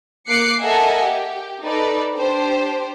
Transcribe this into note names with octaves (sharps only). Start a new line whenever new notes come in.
A#3 D6 F#6 C7 C#7
A4 A#4 D#5 E5 F#5 G#5
G4
D#4 A4 B4 D5
D4 G4 C5